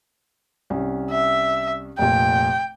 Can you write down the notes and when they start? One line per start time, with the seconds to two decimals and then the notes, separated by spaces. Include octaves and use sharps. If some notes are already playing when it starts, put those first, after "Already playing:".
0.70 C2 C#4
1.11 E5
1.98 F1 A#2 G5